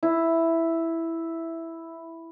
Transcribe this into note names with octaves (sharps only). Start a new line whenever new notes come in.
E4